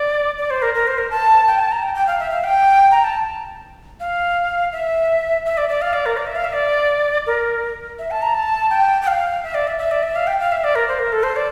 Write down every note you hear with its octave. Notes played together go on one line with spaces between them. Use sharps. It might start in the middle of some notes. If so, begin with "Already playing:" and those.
Already playing: D5
D5
C5
A#4
A#4
C5
A#4
A5
G5
A5
A#5
G5
G5
F5
E5
F5
G5
A#5
A5
F5
E5
E5
D5
D5
F5
D5
A#4
D5
E5
F5
E5
D5
A#4
E5
A5
A#5
A5
G5
G5
F5
E5
D5
E5
E5
D5
E5
F5
G5
F5
E5
D5
A#4
C5
A#4
A4
C5
D5